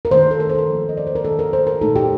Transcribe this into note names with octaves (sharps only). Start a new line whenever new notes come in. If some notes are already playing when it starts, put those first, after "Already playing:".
A#4
D#3 A3 D4 C5
A4
A#4
C5
A4
A#4
F3 A#3 D4
D#5
D5
C5
A#4
D#3 A3 D4 A4
A#4
C5
A#4
A#2 A3 D#4 A4
G4